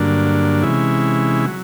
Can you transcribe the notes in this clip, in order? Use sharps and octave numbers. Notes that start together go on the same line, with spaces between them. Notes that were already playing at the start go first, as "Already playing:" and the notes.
Already playing: G2 D3 F#3 A#3 D4
C3 E3 G#3 C#4 E4
F#3